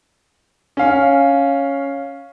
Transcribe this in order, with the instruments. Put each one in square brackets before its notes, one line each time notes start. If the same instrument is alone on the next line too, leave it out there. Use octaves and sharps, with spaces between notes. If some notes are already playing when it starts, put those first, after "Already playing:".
[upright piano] C#4 F5